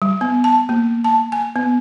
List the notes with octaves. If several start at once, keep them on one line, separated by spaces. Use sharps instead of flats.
G3
B3
A5
A#3
A5
G#5
B3